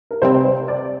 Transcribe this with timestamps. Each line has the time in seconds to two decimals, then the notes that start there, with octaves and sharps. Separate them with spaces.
0.11 A#4
0.22 C3 G3 C4 C5
0.45 C5
0.68 D5